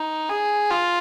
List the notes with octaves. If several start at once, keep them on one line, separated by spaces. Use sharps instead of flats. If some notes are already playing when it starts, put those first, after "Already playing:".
Already playing: D#4
G#4
F4